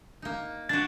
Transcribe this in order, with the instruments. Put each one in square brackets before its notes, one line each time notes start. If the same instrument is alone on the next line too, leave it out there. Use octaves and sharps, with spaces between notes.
[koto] A#3 D#4
[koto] D4 F#4 [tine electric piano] A6